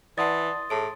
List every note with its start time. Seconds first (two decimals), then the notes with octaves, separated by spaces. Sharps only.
0.18 E3 D5 F#5 A5 C6 D#6 A6
0.70 A2 G#4 A5 D7